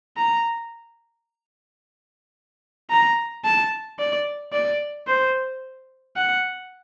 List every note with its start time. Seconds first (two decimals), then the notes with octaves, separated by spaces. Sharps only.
0.17 A#5
2.90 A#5
3.45 A5
3.99 D5
4.53 D5
5.07 C5
6.16 F#5